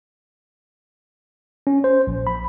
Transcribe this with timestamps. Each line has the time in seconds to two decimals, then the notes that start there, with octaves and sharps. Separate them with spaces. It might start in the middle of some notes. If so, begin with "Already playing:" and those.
1.67 C#4
1.84 C5
2.07 A#1
2.27 B5